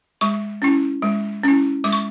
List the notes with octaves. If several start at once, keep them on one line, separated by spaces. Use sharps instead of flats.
G#3 C#6
C#4 E4
G#3
C#4 E4
G#3 D6
C#6